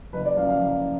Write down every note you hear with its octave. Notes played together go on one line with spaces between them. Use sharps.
F#1 B4
D5
F#2 F3 F5
F5
F#1 F5